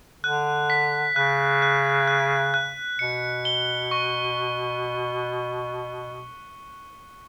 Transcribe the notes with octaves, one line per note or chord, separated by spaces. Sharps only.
D3 F#6
B6
C#3 F#6
F#6
F#6
F#6
B2 C#7
G7
C#6